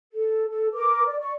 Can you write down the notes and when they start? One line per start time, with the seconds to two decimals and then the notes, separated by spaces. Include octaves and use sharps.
0.12 A4
0.50 A4
0.74 A#4 B4 D6
1.05 D5
1.21 D5 C#6